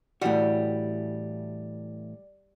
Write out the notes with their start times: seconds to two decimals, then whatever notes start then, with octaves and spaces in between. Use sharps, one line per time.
0.22 A2 E3 G3 F#4